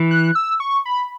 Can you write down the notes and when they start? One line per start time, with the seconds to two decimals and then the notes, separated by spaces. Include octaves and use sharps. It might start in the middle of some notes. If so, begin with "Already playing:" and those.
Already playing: E3
0.11 F#6
0.35 E6
0.60 C#6
0.86 B5